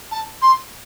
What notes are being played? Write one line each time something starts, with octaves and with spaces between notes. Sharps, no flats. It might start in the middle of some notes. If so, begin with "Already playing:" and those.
A5
C6